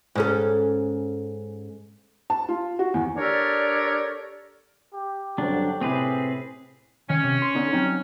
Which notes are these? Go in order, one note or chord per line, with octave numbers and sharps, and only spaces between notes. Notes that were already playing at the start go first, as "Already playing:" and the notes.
G#2 C#4 A4
A5
F4
F#4
E2
D4 G4 A4 A#4 C#5 D5
G4
G2 D3 F#3 C4 D4
A2 C3 C4 G#4 B4
D#3 C#4
C3
C6
D3 B3 D#4
F#3 C4 D#4